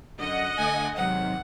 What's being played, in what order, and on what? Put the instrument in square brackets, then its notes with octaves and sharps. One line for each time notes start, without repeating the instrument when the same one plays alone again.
[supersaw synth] F#2 D3 [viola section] D#5 F#5
[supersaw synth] D3 A3 [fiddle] G#5
[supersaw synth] G#2 C3 D#3 [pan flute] F#3 [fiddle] F#5